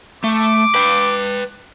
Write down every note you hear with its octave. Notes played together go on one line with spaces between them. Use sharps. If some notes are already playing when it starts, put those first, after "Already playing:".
A3 D6
B4 G5